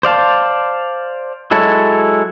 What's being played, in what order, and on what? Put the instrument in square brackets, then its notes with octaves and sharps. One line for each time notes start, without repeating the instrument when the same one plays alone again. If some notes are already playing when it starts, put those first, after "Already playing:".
[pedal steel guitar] C5 D5 F5 A5
F#3 G#3 E4 A4 C#5